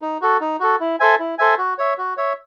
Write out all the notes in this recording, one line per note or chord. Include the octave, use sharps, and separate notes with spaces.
D#4
F#4 A4
D#4
F#4 A4
E4
A4 C5 E5 G#5
E4
A4 C5 E5 G#5
F#4
C#5 E5
F#4
C#5 E5